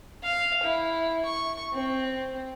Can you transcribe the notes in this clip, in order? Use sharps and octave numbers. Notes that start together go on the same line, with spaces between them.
F5
E4
C#6
C4